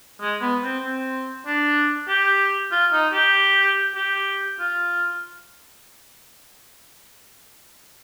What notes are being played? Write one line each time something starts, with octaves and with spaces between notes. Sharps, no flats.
G#3
B3
C4
C4
D4
G4
F4
D#4
G4
G4
F4